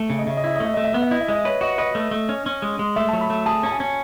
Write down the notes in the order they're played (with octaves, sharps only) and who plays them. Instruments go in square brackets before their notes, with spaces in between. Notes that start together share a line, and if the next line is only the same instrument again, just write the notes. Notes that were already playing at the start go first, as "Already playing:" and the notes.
Already playing: [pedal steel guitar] A3 [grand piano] E5
[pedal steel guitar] C#3
[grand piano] D#5
[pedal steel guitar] C#3 [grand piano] E5
[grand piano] D#5
[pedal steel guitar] E4 [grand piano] E5
[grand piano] D#5
[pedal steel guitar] A3
[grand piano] E5
[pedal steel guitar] A3 [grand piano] D#5
[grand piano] E5
[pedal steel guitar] B3 [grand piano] D#5
[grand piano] E5
[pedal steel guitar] E4 [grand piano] D#5
[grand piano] E5
[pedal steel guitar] G#3 [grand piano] D#5
[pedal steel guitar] B4 [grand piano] C#5
[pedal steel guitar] F#4 [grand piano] D#5
[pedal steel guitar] B4 [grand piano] D#5
[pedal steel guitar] A3
A3
C#4
C#4
G#3
G#3
[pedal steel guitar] A3 [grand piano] E5
[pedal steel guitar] F#3 [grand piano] A5
[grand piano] B5
[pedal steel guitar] A3
[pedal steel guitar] G#4 [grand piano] A5
[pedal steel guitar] C#4 [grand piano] A5
[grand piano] G#5
[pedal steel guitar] C#4